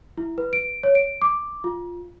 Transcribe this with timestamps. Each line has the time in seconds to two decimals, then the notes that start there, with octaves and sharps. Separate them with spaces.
0.17 E4
0.38 B4
0.53 D7
0.83 C#5
0.95 D7
1.22 D6
1.64 F4